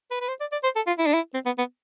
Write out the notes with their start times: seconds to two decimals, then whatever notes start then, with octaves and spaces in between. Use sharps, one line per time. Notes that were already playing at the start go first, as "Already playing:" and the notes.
0.11 B4
0.21 B4
0.28 C5
0.40 D5
0.52 D5
0.63 C5
0.76 A4
0.87 F4
0.99 E4
1.06 D4
1.14 E4
1.34 C4
1.46 B3
1.58 B3